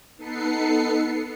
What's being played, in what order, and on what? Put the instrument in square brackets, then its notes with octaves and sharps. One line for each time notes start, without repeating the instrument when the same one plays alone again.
[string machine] B3 D#4 A4 B4 C7 C#7